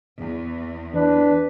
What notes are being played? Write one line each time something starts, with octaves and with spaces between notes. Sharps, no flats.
E2
E3 D4 B4